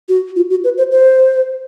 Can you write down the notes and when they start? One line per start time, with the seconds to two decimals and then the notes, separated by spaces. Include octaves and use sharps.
0.09 F#4
0.36 F4
0.50 F#4
0.64 B4
0.78 C5
0.91 C5